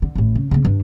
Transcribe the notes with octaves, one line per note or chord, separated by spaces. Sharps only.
D3
A1 A2
C#3
C#3 A#3
G2 D4